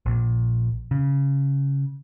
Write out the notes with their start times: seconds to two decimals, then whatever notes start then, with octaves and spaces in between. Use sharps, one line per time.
0.06 A#1
0.91 C#3